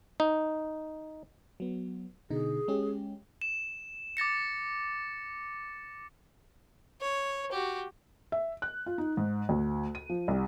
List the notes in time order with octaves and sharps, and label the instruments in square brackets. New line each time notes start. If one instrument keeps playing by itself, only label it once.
[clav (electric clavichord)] D#4
[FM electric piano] F#3 B3
[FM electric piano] B2 D3 D#4 [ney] G#4
[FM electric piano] G#3 C#4 G4
[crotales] E7
D6 A6 A#6 C#7
[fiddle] C#5
F#4 G4
[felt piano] E5
F#6
F4
D#4
G#2
D2
D#7
F3
C2